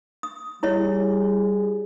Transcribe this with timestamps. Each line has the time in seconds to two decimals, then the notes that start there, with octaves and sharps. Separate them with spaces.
0.23 D#6
0.63 G3 E4 G#4 C#5 D#5